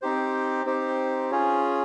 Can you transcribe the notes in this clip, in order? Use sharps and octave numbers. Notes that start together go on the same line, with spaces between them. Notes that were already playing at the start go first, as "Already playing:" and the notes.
C4 D#4 G4 C5
C4 D#4 G4 C5
C#4 F4 G#4 C#5